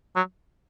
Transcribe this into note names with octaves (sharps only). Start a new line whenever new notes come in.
F#3